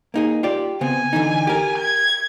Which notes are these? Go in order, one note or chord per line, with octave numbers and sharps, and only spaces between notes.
A#3 D#4 G#4
F4 G4 D5
C#3 B3 C4 G#5
D3 E3 D#4
G4 A#4
G#6